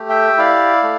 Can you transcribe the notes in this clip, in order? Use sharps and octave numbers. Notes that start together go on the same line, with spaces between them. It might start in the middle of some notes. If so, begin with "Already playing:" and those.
Already playing: A3 G4
E5 G5
E4 D5 F5
A3